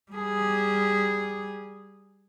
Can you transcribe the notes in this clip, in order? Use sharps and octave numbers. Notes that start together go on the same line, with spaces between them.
G3 G#4